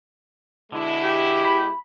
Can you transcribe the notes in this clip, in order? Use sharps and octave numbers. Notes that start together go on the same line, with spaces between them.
B2 D3 G#3 E4
G4
B5